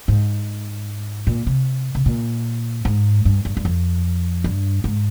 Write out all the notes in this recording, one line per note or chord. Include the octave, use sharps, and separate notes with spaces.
G#2
A#2
C3
C3
A#2
G#2
G2
G2
G2
F2
G2
G#2